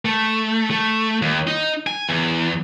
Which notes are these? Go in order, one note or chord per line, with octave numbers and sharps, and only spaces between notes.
A3
A3
D#2
D#4
G#5
E2